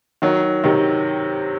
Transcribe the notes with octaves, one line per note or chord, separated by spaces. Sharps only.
D#3 F#3
C3 D#3